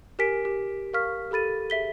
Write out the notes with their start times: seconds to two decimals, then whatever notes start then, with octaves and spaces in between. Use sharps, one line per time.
0.19 G4 A#4 G#5 B6 D7
0.45 G4
0.93 A#4 F5 C#6 F6 B6
1.31 G4 A4 B5 A6 D#7
1.70 G#4 E5 B6 G7